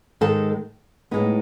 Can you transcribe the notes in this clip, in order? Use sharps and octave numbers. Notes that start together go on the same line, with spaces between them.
G#2 D#3 G#3 A4
A2 G#3 B3 D#4